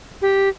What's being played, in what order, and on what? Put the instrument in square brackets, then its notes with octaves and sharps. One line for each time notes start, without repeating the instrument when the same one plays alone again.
[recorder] G4